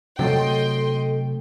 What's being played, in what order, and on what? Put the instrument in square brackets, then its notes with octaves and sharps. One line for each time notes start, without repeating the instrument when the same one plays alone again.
[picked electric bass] C3 F#3 A3 [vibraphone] A4 [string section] D#5 G5 C6